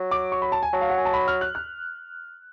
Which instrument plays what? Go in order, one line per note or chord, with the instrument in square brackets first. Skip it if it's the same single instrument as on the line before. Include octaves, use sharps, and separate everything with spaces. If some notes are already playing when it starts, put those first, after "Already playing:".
Already playing: [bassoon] F#3
[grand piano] D6
C#6
B5
A5
G#5
[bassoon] F#3 [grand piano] A5
[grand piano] F5
F#5
G#5
A5
B5
F6
F#6
F#6